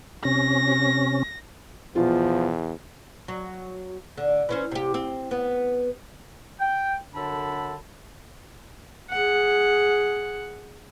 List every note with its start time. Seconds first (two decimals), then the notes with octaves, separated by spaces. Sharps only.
0.25 C3 C#4 A#6
1.96 E2 B2 F3 F4
3.28 F#3
4.17 D3
4.49 E3 C#4 C5
4.71 C3 G4
4.94 C4
5.31 B3
6.60 G5
7.14 F#2 D3 D4 A4 A5 B5
9.11 G#4 F#5